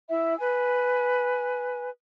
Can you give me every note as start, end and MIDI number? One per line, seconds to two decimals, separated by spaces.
0.10 0.36 64
0.10 0.36 76
0.39 1.89 71
0.39 1.89 80